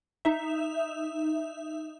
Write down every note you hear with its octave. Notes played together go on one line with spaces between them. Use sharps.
D#4 E5